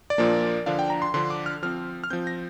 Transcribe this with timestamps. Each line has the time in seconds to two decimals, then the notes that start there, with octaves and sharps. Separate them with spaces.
0.10 D5
0.18 A#2 F3 A#3 D4
0.66 D3 F3 D4 F5
0.79 G5
0.90 A#5
1.02 C6
1.14 D3 F3 D4 C6
1.30 D6
1.46 F6
1.63 F3 C4 F6
2.04 F6
2.10 F3 C4 G6
2.27 A#6